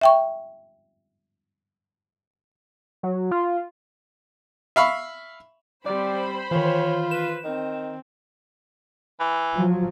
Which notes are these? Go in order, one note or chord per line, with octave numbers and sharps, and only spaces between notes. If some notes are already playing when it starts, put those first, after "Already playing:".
E5 G5 C#6
F#3
F4
E5 F5 B5 C#6
G3 C4 C5 D5 B5
D#3 E3 F4 C#5
B4 E7
D#3 C4
E3
F3 F#3